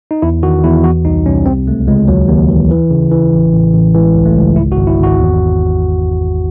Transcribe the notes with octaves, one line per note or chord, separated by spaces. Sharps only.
D#4
E2 E4
D#3 F#4
E2 E4
E3 F#4
C2 D#4
C2 C#4
C3 C4
C#2 A3
C#2 G#3
D#2 F#3
D#2
E3
E3
C#3
E3
A1
A1
A1
E3 G#3
C#2
A3
C#2
G#1 E4
F#4
G#1
E4
G#1 F#4
E2